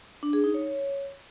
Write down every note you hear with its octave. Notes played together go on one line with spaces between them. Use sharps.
D4
G#4
D#4
C#5